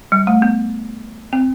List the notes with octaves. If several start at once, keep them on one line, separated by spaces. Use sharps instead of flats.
G3
A3
B3
C4